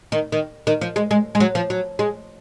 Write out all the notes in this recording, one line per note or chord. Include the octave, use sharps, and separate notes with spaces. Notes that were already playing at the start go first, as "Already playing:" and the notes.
D#3
D#3
D#3
F3
G#3
G#3
G#3
F#3
F3
F#3
G#3